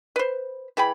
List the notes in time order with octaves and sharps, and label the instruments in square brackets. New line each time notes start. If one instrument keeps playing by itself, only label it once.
[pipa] B4 C5
E3 G#4 G5 B5